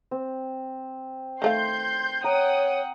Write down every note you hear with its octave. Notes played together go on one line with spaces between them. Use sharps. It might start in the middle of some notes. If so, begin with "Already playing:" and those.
C4
D#3 A3 F5 C6 G6
C#5 F#5 G5 A#5 D#6